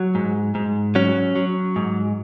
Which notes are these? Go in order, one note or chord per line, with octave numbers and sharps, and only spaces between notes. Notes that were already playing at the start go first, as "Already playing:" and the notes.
Already playing: F#3
G#2
G#2
F#3 C#4
F#3
G#2